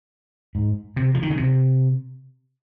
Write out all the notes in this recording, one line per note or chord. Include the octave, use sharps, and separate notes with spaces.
G#2
C3
F3
D#3
C#3
C3